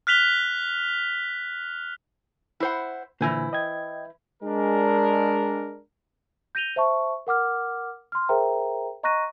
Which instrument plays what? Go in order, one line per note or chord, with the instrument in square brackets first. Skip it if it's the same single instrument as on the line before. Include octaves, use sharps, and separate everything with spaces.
[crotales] F6 F#6 B6 F7 G7
[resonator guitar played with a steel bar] E4 C5 F#5
[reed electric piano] A#2 D3 G#5 [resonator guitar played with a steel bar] E3 E4 C5
[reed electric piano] D#5 G5 G#6
[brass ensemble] G#3 D4 A#4
[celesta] G6 A#6 D#7 F7 G7
C5 E5 A5 C#6
A#4 F#5 D6 F6
C6 F6
G#4 A#4 C5 E5 G5 A#5
D#5 A#5 C#6 F#6 A#6 D#7